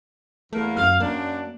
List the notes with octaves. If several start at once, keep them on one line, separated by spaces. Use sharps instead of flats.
E2 A3 A#3
F#2 F5
F#2 A#3 D4